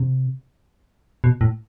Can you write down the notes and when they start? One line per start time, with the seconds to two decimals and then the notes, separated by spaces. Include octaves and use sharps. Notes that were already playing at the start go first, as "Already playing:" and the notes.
Already playing: C3
1.24 B2
1.41 A2